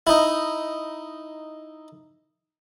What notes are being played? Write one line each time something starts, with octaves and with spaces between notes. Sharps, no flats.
D#4 E4